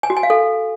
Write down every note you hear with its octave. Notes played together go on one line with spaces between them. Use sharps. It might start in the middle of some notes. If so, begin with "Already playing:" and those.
G#5
F#4
G#5
F5
A4